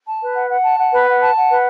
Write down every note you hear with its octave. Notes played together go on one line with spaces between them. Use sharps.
A5
B4
F#5
F#5
A5
F#5
B4
F#5
A5
F#5
B4